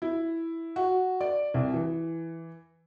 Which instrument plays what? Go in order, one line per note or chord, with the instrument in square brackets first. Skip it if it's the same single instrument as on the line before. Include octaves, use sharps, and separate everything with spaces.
[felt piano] E4
F#4
D5
C2
E3